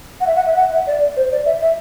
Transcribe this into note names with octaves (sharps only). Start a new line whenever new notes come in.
F#5
E5
F#5
E5
F#5
E5
D5
C5
D5
E5
E5